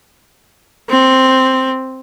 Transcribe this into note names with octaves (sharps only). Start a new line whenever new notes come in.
C4